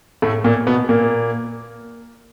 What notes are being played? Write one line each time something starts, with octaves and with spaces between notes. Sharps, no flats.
A2 A3
A#2 A#3
B2 B3
A#2 A#3